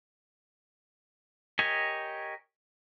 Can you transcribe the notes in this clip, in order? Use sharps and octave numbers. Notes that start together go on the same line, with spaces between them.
G4 A#4 C#5 D#5 G#5